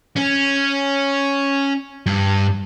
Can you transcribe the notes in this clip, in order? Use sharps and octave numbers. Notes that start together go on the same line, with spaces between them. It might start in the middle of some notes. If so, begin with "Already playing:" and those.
C#4
G2